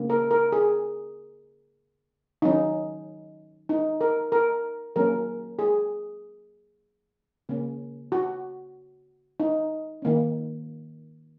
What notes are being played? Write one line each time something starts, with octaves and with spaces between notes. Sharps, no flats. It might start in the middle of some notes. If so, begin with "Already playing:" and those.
Already playing: C#3 A#3 C#4
A#4
A#4
G#4
D#3 F#3 C#4 D#4
D#4
A#4
A#4
F#3 A#3 C#4 A#4
G#4
C#3 A#3 C#4
F#4
D#4
D#3 A#3 C#4